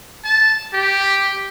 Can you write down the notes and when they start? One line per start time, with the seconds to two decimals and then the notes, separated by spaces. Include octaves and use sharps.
0.24 A5
0.73 G4